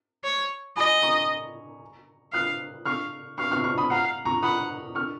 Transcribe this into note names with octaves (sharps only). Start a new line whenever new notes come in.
C#5
D#5 G#5 B5
A#5 C#6
F5 D#6 F#6
F5 C#6 F6
F5 C#6 F6
C#6 F6
C#6 F6
B5 D#6
F5 F#5 A#5
A#5 C#6
F#5 B5 D#6
C#6 F6